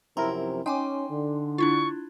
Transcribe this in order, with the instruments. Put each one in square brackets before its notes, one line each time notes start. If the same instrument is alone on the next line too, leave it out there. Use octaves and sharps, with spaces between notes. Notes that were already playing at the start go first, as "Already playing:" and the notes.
[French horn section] F#2 C3 F3 [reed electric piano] C4 E4 A#4 [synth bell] A#5 C6
[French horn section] C#4 [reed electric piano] D#4 C6 [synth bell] G5 G#5 D6
[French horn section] D3
[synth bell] D4 E4 F4 [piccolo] C#6